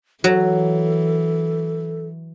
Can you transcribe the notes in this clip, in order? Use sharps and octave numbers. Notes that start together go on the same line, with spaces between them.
E3 F#3 A4